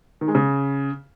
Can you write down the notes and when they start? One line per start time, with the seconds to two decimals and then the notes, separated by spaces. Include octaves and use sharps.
0.21 D#3
0.28 G#3
0.35 C#3